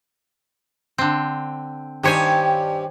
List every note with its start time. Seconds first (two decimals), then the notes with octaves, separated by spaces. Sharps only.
0.98 D3 C4
2.03 G2 D#3 G4 C5 C#5 G#5